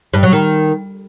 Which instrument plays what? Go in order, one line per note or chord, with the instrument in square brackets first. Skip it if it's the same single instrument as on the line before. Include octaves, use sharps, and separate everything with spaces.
[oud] G2
F#3
D#3